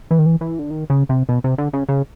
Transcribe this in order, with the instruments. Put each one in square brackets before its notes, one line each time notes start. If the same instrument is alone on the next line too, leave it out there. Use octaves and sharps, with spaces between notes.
[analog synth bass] E3
D#3
E3
E3
D3
D#3
C#3
C3
B2
C3
D3
C#3
C#3